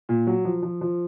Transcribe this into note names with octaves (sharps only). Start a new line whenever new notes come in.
A#2
F#3
F3
F3
F3